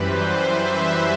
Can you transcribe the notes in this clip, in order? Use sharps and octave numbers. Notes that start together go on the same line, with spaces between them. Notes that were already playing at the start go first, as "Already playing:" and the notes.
Already playing: F#2 E3 G3 B4 C5
E5